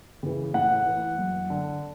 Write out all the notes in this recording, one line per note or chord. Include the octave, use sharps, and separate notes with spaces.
C#3 E3
A2 F#5
E3
F#2
D3